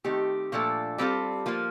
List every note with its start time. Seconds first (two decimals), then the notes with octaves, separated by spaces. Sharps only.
0.04 D#3 A3 C4 G4
0.52 A#2 F3 A3 D4 A4
0.98 G3 C4 F4 A4
1.46 F3 A#3 F4